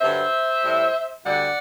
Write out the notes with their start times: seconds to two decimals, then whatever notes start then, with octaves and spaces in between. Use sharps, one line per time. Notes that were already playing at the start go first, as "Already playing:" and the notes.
0.01 G2 D3 F#3 C5 E5
0.63 A2 G3
1.26 D2 D3 G3 D5 F#5